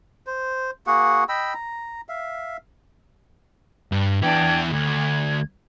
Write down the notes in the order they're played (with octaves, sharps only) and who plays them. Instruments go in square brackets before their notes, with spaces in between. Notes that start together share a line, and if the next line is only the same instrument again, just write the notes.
[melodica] C5
A#3 F#4 G#4 F#5
D#5 G5 B5 E6
A#5
E5 F5
[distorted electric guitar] G2
[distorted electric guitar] E2 E4 [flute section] D4 G5 G#6
[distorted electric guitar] D2 [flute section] G#6